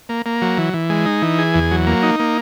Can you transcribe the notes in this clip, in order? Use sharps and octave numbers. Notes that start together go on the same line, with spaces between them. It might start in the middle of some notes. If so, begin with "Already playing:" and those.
A#3
A#3
F#3
E3
E3
G#3
D#4
E3
G#4
E2
F#3
A#3
D#4
A#3